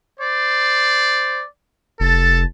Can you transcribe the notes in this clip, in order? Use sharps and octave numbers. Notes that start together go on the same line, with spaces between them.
C5 D5
F1 A4 A5